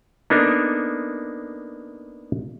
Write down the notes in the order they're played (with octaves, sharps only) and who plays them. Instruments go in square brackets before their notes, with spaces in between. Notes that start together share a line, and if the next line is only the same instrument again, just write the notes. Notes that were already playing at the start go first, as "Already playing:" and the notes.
[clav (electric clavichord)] A#3 B3 D4 D#4 A4 A#4